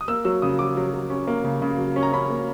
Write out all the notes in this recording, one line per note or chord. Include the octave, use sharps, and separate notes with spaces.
D#6
A#3 E6
F#3 E6
C#3 D#6
F#3 D6
F#3
F#3
C#4
A#3
C#3
C#3
F#3
C#4
A#5
C#4 B5
A#3